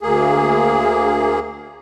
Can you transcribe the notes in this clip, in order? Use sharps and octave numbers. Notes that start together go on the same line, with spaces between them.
D2 A#3 G#4